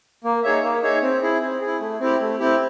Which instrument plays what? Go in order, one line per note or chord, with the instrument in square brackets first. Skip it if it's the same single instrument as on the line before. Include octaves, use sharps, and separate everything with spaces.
[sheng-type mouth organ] A#3
D#4 G#4 C#5 E5
A#3
D#4 G#4 C#5 E5
C4
E4 G#4
C4
E4 G#4
A3
C4 E4 G4
A3
C4 E4 G4